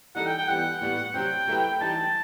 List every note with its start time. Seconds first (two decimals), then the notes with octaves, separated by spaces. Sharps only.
0.15 E3 G3 D#4 A4 F#5
0.26 G5
0.38 G5
0.48 E3 G3 B3 F#5
0.81 A2 G3 B3
1.14 C3 F#3 C4 G5
1.47 F#3 A3 E4 G4 B4
1.81 E3 G3 D#4 G4 A5